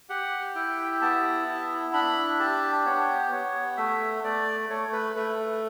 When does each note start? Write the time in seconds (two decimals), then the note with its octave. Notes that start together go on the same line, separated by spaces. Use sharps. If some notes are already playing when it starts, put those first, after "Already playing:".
0.09 G4 F#5
0.55 E4 G5
1.02 B3 A5
1.47 E4
1.93 D4 B5
2.40 G4 A5
2.86 B3 C#5
3.32 B3 C#5
3.77 A3 E5
4.24 A3 D5
4.70 A3 C#5
4.93 B4
5.16 A3 B4